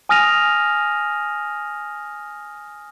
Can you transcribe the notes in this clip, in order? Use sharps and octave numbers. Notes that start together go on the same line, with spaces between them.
G#5 D#6 F6 A#6 D#7 F7